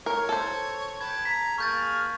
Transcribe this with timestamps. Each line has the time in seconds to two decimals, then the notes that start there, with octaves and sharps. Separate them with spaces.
0.06 A#4 C#5
0.29 A4 C5 A5
1.01 B4 G5 A5 G#6
1.25 A#5 B6
1.58 A#3 G#4 C#6 F6 G6 A6